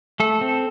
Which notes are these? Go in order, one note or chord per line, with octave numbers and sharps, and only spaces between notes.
A3 A4
C4